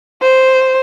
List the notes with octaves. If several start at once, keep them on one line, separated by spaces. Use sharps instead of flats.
C5